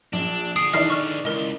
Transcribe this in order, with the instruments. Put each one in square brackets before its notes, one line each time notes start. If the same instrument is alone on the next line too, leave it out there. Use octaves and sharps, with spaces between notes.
[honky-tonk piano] A#1 [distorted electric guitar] D4
[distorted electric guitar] D3 G#4 [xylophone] D#6 C7 D7
[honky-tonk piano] D#3 E3 D5 [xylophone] D#5 F6 C7
[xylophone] C#6 F6
[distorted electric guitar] C#2 [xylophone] A#4 D#5